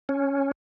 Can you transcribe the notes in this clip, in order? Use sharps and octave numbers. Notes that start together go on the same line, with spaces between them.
C#4